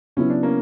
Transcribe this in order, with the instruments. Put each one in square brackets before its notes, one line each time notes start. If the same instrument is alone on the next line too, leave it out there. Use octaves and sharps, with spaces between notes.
[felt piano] C#3 F#3 B3 E4 [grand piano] C#4
[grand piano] D4
A#3 C#4